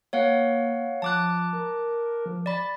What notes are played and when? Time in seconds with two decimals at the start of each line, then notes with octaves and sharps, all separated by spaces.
0.13 A#3 C#5 F5 F#5
1.02 F3 A5 D6 F#6
1.53 A#4
2.26 F3
2.46 D5 B5 A6